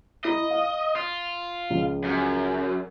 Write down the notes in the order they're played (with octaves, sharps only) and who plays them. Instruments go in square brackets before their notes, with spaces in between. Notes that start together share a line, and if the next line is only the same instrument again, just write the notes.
[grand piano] E4 A#5 [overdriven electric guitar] D#5
[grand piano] F5
[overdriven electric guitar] F4
[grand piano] C#2 F3
[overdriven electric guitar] F#2